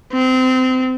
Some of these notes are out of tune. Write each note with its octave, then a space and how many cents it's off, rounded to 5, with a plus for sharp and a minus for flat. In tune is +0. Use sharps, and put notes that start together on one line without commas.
C4 -25